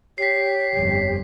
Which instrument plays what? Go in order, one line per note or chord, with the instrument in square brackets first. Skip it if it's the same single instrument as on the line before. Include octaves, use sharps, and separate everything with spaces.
[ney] G4 [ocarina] C#5 [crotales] B6 C7
[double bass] G1 F2